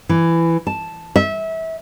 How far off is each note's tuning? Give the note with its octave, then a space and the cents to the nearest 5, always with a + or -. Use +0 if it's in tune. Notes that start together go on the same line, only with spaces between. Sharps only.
E3 +15
A5 -5
E5 -25